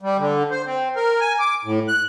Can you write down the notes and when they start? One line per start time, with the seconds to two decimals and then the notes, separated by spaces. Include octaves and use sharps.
0.02 G3
0.18 D3
0.51 C5
0.66 C4
0.96 A#4
1.20 G#5
1.39 D6
1.65 A2
1.88 F#6